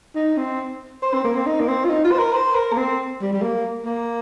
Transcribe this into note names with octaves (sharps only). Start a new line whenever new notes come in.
D#4
C4
C5
C4
A#3
C4
D#4
A#3
C4
F4
D#4
F4
C5
A#4
C5
A#4
A#3
C4
G3
G3
A#3
A#3